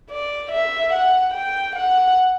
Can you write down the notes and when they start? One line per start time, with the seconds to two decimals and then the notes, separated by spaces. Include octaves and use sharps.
0.11 D5
0.52 E5
0.93 F#5
1.34 G5
1.76 F#5